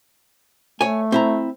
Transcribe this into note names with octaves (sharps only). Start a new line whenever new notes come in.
A3 C#5 G#5
C4 E4 A#5